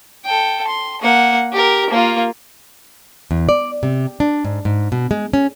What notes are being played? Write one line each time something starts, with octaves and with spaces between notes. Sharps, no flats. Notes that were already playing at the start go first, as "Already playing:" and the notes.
A4 G5
C6
A#3 F#5
G4 A#4
A#3 F4
E2
D5
C3
D4
G#2
G#2
B2
G#3
C#4